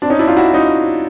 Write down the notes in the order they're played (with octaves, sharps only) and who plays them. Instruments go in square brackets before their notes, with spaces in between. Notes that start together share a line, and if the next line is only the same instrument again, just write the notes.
[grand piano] C4 D4
C#4 D#4
D4 E4
D#4 F4
E4 F#4
C#4 D#4